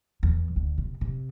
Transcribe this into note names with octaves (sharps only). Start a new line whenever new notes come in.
E2
D2
C3
C3